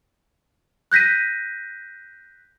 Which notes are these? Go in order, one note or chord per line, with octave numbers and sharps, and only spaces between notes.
F#6 G6 A#6 B6 D#7